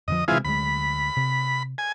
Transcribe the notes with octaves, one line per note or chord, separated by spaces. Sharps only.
F2 D3 F3 D#5
C3 E3 G#3 C4 F4 G#4
D2 F#3 G#3 B5
C3
G#5